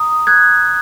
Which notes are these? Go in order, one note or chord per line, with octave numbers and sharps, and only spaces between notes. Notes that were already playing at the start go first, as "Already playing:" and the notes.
Already playing: A#5 D#6
F#6 G#6